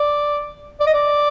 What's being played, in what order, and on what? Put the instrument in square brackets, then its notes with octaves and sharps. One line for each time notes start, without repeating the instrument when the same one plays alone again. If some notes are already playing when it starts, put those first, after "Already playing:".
Already playing: [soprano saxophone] D5
D5
D#5
D5